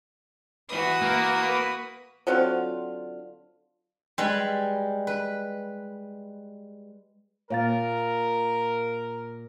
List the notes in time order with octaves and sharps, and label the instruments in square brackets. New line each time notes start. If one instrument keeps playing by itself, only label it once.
[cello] E3 B4 [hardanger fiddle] F#4 D#6
[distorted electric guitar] A#3 A#4
[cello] B4
[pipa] D3 F#3 C4 F4
[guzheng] G3 G#3 B4
B4
[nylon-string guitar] A#2 [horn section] A#4 [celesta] C#5 F5 A6